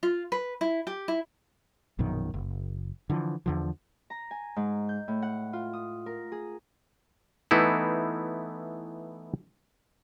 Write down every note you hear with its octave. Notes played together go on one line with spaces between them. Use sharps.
F4
B4
E4
G4
E4
A#1 F#2 B2 D#3
F#1
D3 E3 F3
E2 D3 F3
A#5
G#5
G#2
G6
A2
F#5
F4
D#6
A#4
G#4
E3 A3 B3 D#4 E4